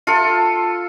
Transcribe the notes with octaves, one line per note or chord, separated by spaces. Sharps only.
F4 A4